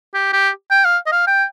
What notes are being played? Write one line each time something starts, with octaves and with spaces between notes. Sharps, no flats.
G4
G4
G5
F5
D#5
F5
G5